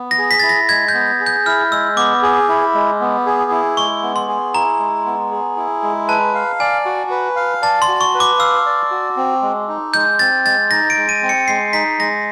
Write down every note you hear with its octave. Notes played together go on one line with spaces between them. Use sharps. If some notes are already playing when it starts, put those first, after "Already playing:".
Already playing: B3
A#6
G#4
B6
E4 A6
A#6
G#3 G#6
G6
B3
G#4
G6
E4 F6
G#3 E6
B3 D6
G#4
E4
G#3
B3
G#4
E4
G#3 C#6
B3
C6
G#4
E4 A#5
G#3
B3
G#4
E4
G#3
B4 A5
F5
D5 G#5
F#4
B4
F5
D5 A5
C6
F#4
C#6
B4
D6
F5 E6
D5
F#4
C4
G#3
D#4
G#3 G6
C4 A6
G#3 A6
D#4 A#6
D7
G#3
D#7
C4
C#7
G#3 C7
D#4 B6
G#3 A#6